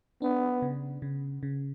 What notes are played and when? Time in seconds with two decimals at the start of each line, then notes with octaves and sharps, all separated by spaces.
0.22 B3 D4
0.62 C#3
1.02 C#3
1.43 C#3